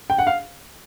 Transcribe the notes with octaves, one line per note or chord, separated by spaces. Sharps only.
G5
F#5
F5